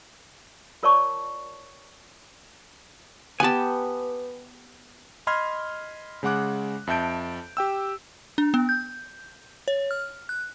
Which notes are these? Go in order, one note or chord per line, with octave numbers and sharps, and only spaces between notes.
F4 A#4 C#5 D5 A5 C#6
B3 G4 B4 G#5 A5
D#5 B5 C6 F6 G#6
C#3 G#3 F#5 D6 F#6
F2 E5 A5 G6 D7
G4 G5 E6
D4
B3
G6
C#5
F6
F#6